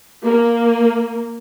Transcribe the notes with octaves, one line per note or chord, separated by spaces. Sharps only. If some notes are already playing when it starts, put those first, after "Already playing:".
A#3